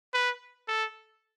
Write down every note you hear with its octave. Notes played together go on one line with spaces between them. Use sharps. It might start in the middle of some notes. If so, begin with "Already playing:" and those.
B4
A4